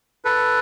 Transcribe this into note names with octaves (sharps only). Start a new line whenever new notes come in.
A4 B4